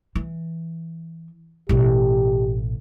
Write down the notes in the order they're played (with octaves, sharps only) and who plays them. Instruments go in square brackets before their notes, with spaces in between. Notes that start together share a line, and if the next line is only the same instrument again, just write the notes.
[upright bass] E3
[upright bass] A1 B2 [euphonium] G4